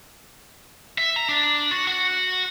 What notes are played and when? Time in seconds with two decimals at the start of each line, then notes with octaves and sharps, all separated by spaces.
0.98 E5
1.16 A#5
1.29 D4
1.71 F#4
1.87 F#4